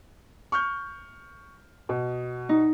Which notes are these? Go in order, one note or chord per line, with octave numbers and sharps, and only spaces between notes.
C#6 F6 G6
B2
D#4